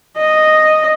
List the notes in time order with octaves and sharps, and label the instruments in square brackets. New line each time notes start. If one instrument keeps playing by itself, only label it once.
[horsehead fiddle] D#5